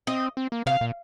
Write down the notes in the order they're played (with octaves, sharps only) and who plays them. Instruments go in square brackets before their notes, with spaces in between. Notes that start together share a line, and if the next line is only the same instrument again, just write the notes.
[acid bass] C4 [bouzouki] D#5
[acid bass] C4
A#3
[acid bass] C3 [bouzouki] F5
[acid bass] A#2